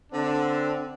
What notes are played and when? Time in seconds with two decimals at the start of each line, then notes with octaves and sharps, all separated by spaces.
0.13 D3 C4 D4